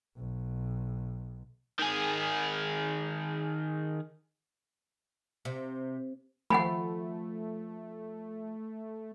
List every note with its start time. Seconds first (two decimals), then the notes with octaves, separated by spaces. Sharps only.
0.17 B1
1.79 D#3 G#4
5.45 C3
6.50 F3 A3 F#5 G#5 B5